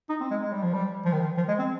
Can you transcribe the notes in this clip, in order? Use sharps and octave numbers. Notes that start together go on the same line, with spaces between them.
D#4
C4
G#3
G#3
G3
F3
G3
F3
D#3
F3
F3
G#3
C4